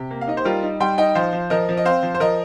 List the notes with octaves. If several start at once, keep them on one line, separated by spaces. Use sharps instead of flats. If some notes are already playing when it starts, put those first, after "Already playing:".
Already playing: C3 G4
A#3
F5
D#4 D#5
C5
G3 F4 A#4
D#4
G3 G5 C6
D#4 D#5 G5
F3 C5 F5
F3
F3 A#4 D#5
F3
D#5
C4 C5 F5
F3
C5
F3 A#4 D#5